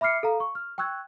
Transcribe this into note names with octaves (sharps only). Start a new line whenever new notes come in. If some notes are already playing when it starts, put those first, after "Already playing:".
E5 B5 D6 F6 C7 C#7
A4 F5 A#5
C#6
F6
G5 C#6 E6 F#6 G#6